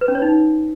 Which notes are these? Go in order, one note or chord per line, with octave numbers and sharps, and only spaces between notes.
B4
C#4
C#5
D#4